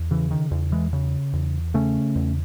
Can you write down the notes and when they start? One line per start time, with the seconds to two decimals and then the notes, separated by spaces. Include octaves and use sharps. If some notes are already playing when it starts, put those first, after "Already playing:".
Already playing: E2
0.11 C#3 E3
0.31 D#3
0.51 E2
0.72 E3 G#3
0.93 C#3
1.33 E2
1.74 C#3 A3 C#4
2.16 E2